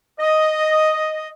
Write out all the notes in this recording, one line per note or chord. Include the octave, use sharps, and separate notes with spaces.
D#5